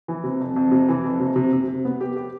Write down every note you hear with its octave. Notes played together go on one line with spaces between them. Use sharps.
E3
C3
F2
F2
C3
E3
F2
C3
C3
C3
C3
B3
G4
G4